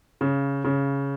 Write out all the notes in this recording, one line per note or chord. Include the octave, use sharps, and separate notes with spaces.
C#3
C#3